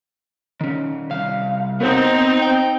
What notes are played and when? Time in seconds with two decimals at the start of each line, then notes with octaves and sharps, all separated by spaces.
0.61 D#3 C#4
1.11 C2 F5
1.80 B3 C4 D#4
2.42 G5